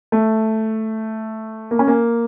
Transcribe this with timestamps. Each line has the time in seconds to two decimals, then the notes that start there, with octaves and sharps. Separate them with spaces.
0.12 A3
1.71 A#3
1.79 C#4
1.87 A#3